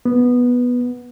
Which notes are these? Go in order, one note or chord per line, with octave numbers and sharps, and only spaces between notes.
B3